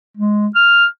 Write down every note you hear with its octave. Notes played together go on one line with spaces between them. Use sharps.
G#3
F6